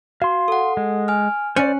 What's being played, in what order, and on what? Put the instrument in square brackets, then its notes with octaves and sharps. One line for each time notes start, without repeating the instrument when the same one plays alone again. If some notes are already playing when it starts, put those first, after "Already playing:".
[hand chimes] F#4 [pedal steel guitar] F5 C6
[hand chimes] A4 F#5
[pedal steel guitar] G#3
[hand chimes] G#5 F6
[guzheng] C#4 [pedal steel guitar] C5 D5 [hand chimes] F#6